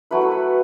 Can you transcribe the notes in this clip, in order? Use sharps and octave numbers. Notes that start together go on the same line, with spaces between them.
F#3 A3 E4 B4
A4
B4